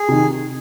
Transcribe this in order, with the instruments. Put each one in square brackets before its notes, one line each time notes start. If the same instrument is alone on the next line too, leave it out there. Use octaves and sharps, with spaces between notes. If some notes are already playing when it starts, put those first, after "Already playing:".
Already playing: [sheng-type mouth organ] G#4
[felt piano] C3 D#3